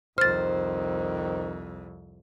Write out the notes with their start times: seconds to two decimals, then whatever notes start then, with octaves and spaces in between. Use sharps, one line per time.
0.18 C2 F2 D#3 C5 F6 A6